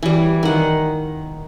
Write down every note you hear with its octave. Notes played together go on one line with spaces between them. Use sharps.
E3 G3
D#3 F#5